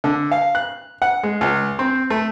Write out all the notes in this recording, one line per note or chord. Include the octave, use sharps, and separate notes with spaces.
D3
F5
F#6
F#5
G#3
C#2
C4
A3